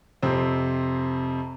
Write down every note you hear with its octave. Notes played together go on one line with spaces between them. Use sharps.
F2 C3 C4